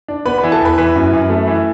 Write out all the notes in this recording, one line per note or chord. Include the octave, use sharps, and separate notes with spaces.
D4
B3 B4 B5
B4 B5
E3
A4 A5
E2 B4 B5
E3 B4 B5
F#2
F#2
A3
E3